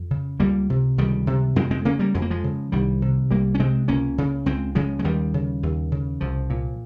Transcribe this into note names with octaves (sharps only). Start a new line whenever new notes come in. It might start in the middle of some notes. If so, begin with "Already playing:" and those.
Already playing: F2
C#3
C#2 G3 A#3
C3
C#2 D#3 G3
C3
F2 G#3 C4
G#3 C4
C#3 A#3 C#4
G3 A#3
F2 G#3
A#3
F3 G#3
C#3
C2 D#3 G3
C3
C2 G3 A#3
C#4
C3 G#3 C4
C#2 A#3 C#4
C#3
C#2 G#3 C4
C#3 F3 G#3
G#3
D#2 D#3 G3
C#3
D#2
C#3
C2 F3
A#2